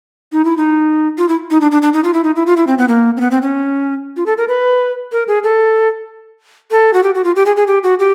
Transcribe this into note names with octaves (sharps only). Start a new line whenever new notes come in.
D#4
E4
D#4
F4
E4
D#4
D4
D4
D4
D#4
F4
E4
D#4
E4
F4
E4
C4
B3
A#3
C4
B3
C4
C#4
F4
A4
A#4
B4
A#4
G#4
A4
A4
F#4
G4
F#4
F4
G4
G#4
G#4
G4
F#4
G4